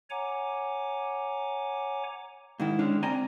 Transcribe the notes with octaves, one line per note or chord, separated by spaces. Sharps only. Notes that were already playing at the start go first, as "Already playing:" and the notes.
C#5 F#5 G#5 A#5 D6
G#2 D#3 E4
D3 G#3 C#4 D4
C4 D5 G5 G#5 A#5